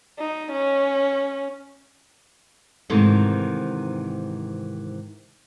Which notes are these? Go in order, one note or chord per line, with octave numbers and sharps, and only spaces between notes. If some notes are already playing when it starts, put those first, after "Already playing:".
D#4
C#4
G#2 C3 D#3 E3 A3